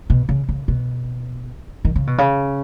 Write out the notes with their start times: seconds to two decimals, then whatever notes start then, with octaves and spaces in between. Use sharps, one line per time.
0.10 B2
0.29 C#3
0.49 C#3
0.68 B2
1.85 D#3
1.96 C#3
2.07 B2
2.18 C#3